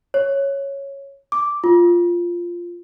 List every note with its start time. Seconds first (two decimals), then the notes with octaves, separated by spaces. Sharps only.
0.14 C#5
1.32 D6
1.64 F4